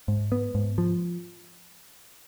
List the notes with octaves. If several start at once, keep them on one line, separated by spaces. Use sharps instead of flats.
G#2
B3
G#2
F3